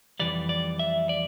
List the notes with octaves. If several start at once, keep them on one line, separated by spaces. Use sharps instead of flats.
F2 C3 E3 G3 D5
D5
E5
D5